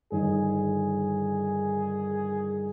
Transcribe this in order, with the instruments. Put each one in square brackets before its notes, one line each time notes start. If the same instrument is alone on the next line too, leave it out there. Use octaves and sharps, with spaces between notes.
[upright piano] G1 D#3 [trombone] G#4